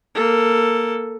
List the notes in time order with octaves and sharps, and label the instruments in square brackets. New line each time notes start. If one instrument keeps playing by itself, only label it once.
[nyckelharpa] A#3 A4